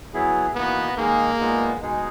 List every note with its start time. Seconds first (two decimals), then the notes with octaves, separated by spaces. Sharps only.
0.14 F#3 B3 E4 G#4
0.55 E3 A#3 B3 D#4 F#4
0.97 D#3 G#3 A#3 D#4 G#4
1.39 A#2 G#3 B3 D#4
1.81 B2 G#3 D#4 G#4